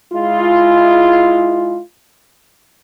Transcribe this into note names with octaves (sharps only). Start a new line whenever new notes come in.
G#3 E4 F4